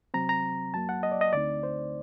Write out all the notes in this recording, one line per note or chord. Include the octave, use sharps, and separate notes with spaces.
C3 F#3 C4 A#5
A#5
F#2 F#3 A#3 A5
F#5
D#5
D5
D#5
D2 D3 A3 C4 D#4 D5
C5